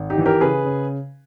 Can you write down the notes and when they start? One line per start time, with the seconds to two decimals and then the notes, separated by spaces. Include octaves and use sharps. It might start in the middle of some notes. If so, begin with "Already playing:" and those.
Already playing: G#1
0.10 D#4 G4
0.18 E3
0.26 G4 A#4
0.41 C#3 G#4 B4
0.64 C#3